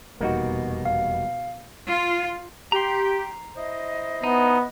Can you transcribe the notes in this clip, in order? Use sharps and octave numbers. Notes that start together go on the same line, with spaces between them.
F1 E2 B2 G3 A#3 D#4 F#4
F5
F4
G4 A#5 C6
E4 C5 D#5
B3 D#4